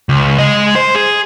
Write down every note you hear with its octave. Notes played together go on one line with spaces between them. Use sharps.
C#2
G#3 D#5
C5
G#4